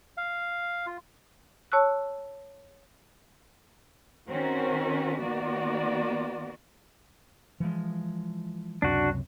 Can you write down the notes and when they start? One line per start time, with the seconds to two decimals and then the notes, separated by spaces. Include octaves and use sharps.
0.17 F5
0.86 F4
1.72 C#5 A5 C#6 E6 F#6
4.29 D#3 C4 C#4 F#4 A#4
5.20 D#3 A#3 B3 F#4 D5
7.60 E3 F3 G#3
8.82 C#2 F#2 C3 D4 F#4